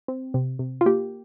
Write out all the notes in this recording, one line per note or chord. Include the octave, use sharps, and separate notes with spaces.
C4
C3
C3
F4
A#3 G4